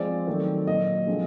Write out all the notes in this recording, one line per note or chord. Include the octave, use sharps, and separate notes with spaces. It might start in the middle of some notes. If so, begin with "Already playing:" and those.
Already playing: F3 G#3 C4 D5
D#3 F#3 A3 C4
A#2 F#3 A#3 D#5
D3 F3 G#3 C4